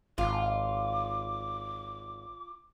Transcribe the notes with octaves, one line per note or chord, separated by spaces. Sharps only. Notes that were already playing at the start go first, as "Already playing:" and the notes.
G#1 F4 D6